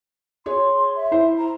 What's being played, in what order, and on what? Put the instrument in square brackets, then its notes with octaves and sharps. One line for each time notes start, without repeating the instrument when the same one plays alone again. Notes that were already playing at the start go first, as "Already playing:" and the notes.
[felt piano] G#4 C#5 [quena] C6
[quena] E5
[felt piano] E4 C5
[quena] A#5